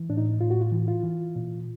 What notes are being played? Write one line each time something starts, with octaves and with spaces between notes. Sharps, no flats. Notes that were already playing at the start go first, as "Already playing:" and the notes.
Already playing: E3
A2 D4
D#4
A2 F4
F#4
F4
E3
F4
E3
A#2